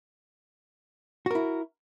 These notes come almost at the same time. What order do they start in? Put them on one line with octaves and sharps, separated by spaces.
F#4 A#4 E4